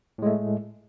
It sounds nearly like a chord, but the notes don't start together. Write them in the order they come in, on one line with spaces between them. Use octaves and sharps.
A2 G#3 A3